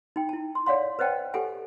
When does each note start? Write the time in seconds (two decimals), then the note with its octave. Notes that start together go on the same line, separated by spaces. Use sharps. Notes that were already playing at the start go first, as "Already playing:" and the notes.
0.16 D#4 G5
0.29 E4 A5
0.55 C6
0.66 C#5 D5 F5 F#5 C6
0.99 B4 C5 D#5 F#5 G5 A5
1.34 G4 A4 F#5 G#5